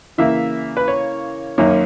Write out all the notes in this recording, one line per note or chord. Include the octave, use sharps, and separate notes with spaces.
C#3 E3 A#3 E5
B4
C#5
F#2 D#3 A#3 C#4